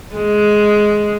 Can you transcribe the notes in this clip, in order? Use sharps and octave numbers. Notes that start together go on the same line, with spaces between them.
G#3